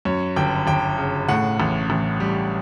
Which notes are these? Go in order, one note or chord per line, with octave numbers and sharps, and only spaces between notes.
F#2 C#5
G1 G5
G1 G5
C#3
A2 F#5
A1
A1
G3